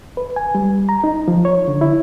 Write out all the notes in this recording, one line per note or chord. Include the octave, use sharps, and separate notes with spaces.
B4
G#5
G3
A#5
D#4
F3
C#5
D3
E4